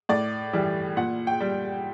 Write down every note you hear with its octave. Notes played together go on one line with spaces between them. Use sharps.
A2 D5
E3 G3
A#2 F#5
G5
G3